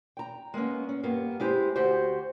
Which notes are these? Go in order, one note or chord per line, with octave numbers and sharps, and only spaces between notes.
G5 A#5
G#3 A#3 B3 C#4
C#4
G2 A#3 B3
G#3 E4 G4 C5
D2 F#4 G4 C5